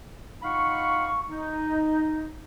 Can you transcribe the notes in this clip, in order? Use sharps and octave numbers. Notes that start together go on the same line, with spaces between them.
D#4 F4 F5 F#5 B5 C#6
D#4